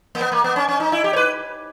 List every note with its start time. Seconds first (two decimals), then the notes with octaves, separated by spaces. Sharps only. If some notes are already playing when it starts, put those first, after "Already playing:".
0.15 A#3
0.21 B3
0.32 A#3
0.44 B3
0.56 C#4
0.68 C#4
0.80 D#4
0.92 E4
1.04 G4
1.13 C#5
1.16 B4